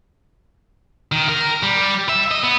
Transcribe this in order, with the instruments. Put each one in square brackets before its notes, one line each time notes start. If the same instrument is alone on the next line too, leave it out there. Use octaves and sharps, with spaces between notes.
[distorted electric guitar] D#3
A#4
G3
E5
D#5
B3